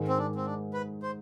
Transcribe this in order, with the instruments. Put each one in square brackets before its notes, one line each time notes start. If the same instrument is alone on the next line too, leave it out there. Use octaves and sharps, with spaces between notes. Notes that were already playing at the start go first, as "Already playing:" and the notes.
Already playing: [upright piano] G#2 D#3 G#3
[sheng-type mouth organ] C4
D4
C4
D4
B4
C5